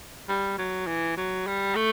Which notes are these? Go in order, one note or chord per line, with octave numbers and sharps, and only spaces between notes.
G3
F#3
E3
F#3
G3
A3